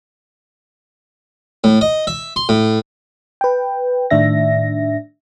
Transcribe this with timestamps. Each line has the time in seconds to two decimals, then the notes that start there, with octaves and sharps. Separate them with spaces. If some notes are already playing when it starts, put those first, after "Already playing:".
1.64 A2
1.81 D#5
2.07 E5
2.36 C6
2.49 A2
3.41 B4 G5
4.10 A2 D#3 D4 E5 A#6